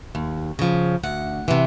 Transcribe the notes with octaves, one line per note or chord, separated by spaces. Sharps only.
D#2
C#3 F3
D2 F#5
C3 E3